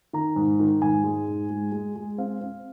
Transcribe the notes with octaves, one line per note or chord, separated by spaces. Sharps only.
D#3 A#5
G#2
D#3
G#2 G#5
G#3
G#2
G#3
G#3
G#3
C4 F5
C4